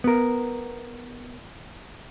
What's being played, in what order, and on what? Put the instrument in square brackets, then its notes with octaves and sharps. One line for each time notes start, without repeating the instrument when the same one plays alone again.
[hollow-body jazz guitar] B3 A#4